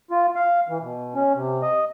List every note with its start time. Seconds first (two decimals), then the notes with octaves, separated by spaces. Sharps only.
0.11 F4
0.35 F5
0.68 E3
0.81 B2
1.15 C#4
1.34 C3
1.62 D#5